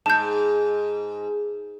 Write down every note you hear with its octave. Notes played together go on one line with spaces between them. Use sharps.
G#2 A5 G6